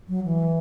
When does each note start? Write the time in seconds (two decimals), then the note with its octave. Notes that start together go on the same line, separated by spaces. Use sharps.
0.08 F#3
0.25 E3